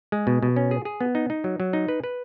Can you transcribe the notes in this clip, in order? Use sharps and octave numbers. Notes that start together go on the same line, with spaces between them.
G#3
B2
B2
C#4
G#4
G#4
B3
D#4
D#4
F#3
F#3
D#4
B4
B4